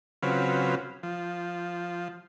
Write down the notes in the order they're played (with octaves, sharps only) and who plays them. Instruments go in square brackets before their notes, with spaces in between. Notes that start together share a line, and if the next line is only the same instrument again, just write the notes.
[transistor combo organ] C#3 F#3 C4 F4 B4
F3